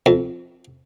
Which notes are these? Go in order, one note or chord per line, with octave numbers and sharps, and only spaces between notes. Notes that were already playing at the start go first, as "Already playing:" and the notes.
F2